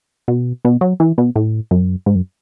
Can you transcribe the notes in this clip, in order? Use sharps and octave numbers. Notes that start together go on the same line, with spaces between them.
B2
B2
F#3
E3
B2
A2
F#2
G#2
F#2